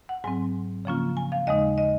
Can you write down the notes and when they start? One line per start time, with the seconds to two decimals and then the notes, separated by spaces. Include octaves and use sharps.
0.09 F#5
0.24 G#2 F#3 C4 G#5
0.85 C#3 F3 A#3 C#4 F4
1.17 G#5
1.32 F5
1.47 D#2 C#3 G#3 D#4 D#5
1.78 D#5